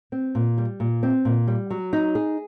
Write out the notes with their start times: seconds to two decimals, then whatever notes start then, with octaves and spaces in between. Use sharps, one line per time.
0.12 C4
0.35 A#2
0.58 G3
0.80 A#2
1.03 C4
1.25 A#2
1.47 G3
1.70 F#3
1.93 D#4
2.15 G#4